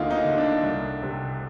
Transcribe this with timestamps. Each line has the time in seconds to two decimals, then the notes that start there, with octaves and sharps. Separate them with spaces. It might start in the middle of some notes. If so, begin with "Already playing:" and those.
Already playing: D2 D3 A#3 D#4 F4
0.11 D#4
0.25 D3
0.38 D4
0.63 C2
1.02 C3